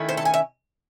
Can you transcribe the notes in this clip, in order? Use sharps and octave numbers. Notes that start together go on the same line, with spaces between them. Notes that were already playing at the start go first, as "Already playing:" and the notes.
Already playing: D#3 A3 C#4 E4
C5
A4
G#5
E5